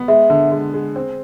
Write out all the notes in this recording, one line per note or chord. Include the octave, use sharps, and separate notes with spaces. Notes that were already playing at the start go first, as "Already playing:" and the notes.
Already playing: B3
G#3 E5
D3
G#3
G#3
C4